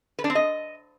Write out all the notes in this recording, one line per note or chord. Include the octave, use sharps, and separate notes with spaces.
B4
D4
C4
D#5